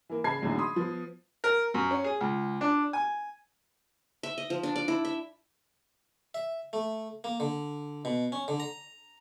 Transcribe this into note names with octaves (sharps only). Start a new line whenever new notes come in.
E3 A#3
C#3 A5 B5 G#6 C7
A#1 E2 A2 D3 F#3 D#4
B5 C6 D#6
F3 B3
A#4
F#2
C#4
G#4
C#2
D4
G#5
E5
D#5
F3
D4
D5
E4
E5
E5
A3
A#3
D3
B2
C#4
D3
A#5